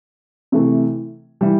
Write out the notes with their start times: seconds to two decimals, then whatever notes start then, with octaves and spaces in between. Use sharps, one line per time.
0.52 C3 E3 A3
1.41 E3 G3